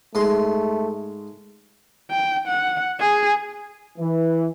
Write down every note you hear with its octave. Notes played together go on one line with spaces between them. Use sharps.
G#2 G#3 A3 C6
G5
F#5
G#4
E3